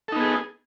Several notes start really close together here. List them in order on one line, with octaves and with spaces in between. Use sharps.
A4 D#4 B3 G#4